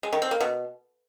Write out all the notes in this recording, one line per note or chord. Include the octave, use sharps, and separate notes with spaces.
G#3
D#3
C4
A#3
B2